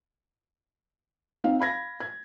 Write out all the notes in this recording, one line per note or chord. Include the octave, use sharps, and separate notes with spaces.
C4 D#4 F5
F5 B5 G#6 A#6
G#6